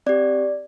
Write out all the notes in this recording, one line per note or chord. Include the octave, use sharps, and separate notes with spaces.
C4 G4 D5